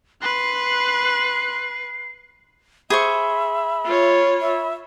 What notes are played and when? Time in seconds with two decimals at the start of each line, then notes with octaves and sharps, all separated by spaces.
0.22 B4 C6 F#6 C7
2.90 G#4 C5 E5 B5 C#6
3.85 F4 C#5
4.41 E5